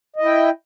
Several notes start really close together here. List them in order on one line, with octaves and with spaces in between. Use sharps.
D#5 E4 G5